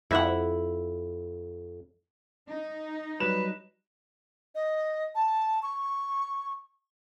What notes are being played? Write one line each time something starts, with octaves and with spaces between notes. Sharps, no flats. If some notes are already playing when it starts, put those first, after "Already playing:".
F2 E4 E5 F#5
D#4
F#3 G3 B4 E7
D#5
A5
C#6